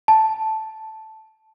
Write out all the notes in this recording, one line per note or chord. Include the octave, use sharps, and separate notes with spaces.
A5